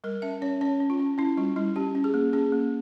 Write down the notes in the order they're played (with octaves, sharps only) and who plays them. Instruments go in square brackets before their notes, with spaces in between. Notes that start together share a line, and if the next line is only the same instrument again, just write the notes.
[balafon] G3 A#4
C#4 E5
C#4 C#5
C#4 C#5
C#4
F4
C#4
C#4 E4
G3 F4
G3 E4
C#4 G4
C#4
G#4
A#3
C#4 G#4
A#3